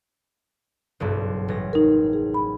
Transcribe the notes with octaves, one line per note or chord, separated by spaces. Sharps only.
F#1 B1 G2
A1 A#6
D#4 A#4
G#4
B5